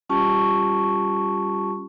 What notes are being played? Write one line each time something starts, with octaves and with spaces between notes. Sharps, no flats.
G3 C#4 F4 G4 A5 C#6